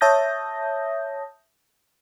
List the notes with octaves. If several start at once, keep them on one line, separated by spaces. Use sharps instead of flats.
C#5 E5 A5 D#6 G6 A#6